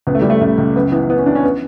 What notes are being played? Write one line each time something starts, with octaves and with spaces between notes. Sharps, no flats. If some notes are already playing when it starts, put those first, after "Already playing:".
C#2 B3
A3
C#2 G3
A3
C#2 A3
C#2
F#2 B3
E3 B3
E3 B3
C#4
E3 D4
C#4
B3